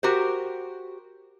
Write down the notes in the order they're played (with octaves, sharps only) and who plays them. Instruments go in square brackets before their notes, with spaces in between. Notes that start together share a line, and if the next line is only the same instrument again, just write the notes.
[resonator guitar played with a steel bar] F#4 G4 A#4 C5